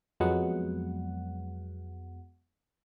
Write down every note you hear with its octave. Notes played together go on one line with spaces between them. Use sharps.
F2 F#3 G#3 B3 F#5